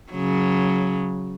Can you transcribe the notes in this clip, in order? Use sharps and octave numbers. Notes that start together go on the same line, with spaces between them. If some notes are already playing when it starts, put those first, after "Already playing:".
C#3 F#3